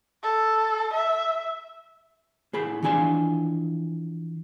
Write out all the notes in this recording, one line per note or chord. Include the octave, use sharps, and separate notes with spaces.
A4
E5
A2 G#4 B5
E3 F3 D4 G#5 A#5 C6